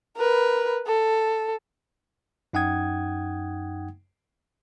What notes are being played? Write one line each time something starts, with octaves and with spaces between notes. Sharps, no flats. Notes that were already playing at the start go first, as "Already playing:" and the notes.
A#4 B4
A4
F#2 D#4 F#5 G5 D#6 G#6